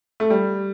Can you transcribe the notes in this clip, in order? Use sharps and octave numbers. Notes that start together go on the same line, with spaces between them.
A3
G3